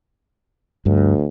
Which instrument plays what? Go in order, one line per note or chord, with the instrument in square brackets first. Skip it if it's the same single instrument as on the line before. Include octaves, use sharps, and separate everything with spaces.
[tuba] D2 [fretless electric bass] G2